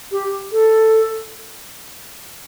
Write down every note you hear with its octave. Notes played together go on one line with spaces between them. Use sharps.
G4
A4